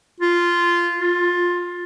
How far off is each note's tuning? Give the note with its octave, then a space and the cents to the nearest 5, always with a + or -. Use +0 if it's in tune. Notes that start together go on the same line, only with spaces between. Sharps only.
F4 -10
F4 +15